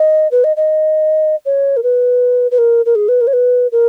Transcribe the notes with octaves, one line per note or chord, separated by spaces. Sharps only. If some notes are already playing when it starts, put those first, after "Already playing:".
Already playing: D#5
B4
D#5
D#5
C#5
A#4
B4
B4
A#4
A#4
G#4
B4
A#4
C#5
B4
A#4